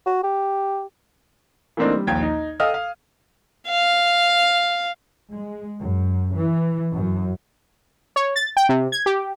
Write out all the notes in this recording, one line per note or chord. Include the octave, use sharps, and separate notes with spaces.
F#4
G4
E3 A3 A#3 C4 D4 D#4
G3
A#1 D#2 G5 G#6
D#4
A4 D#5 F5 G5 D#6 F6
F5
F5
G#3
F#2
E3
F#2
C#5
A6
G5
C3
G#6
G4